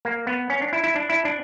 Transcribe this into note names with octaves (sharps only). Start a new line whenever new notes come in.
A#3
B3
C#4
D4
E4
E4
D4
E4
D4